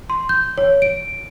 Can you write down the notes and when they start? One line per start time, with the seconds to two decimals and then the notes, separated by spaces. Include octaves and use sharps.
0.10 C6
0.29 G6
0.58 C#5
0.82 D7